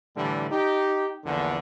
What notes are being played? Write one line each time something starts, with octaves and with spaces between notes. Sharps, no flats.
A2 D3 E3 G3
D#4 G4
A#1 E2 D3